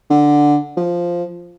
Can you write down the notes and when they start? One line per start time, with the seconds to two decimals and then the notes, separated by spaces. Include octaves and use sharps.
0.10 D3
0.77 F3